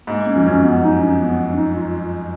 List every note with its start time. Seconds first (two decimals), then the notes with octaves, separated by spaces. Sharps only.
0.07 G#2 A#3
0.26 C#4
0.36 F2
0.44 F#2 C#4
0.63 B3
0.82 D#4
1.00 C#4
1.19 B3
1.49 C#4
1.56 D#4
1.75 F4